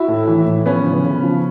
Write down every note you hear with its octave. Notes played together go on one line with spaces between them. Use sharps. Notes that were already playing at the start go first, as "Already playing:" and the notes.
Already playing: E4 F#4
A2
E3
A2
F3 B3 C#4
C#3
C#3
F3